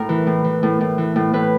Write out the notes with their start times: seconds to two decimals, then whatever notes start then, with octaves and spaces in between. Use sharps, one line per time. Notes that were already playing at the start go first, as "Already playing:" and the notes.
Already playing: A2 A#4
0.09 E3
0.27 A2
0.44 E3
0.63 A2
0.81 A2
0.98 E3
1.16 A2
1.33 A2 B4